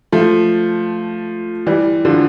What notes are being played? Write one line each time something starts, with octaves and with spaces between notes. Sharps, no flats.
F3 A3
E3 G3
D3 F3